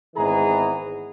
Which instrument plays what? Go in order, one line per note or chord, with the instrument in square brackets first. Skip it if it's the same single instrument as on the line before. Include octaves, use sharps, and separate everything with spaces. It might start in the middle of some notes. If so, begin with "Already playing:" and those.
[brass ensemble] G#1 G#2 E3 B3 G#4 A#5